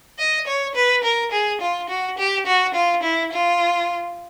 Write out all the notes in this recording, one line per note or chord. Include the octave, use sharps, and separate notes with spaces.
D#5
C#5
B4
A#4
G#4
F4
F#4
G4
F#4
F4
E4
F4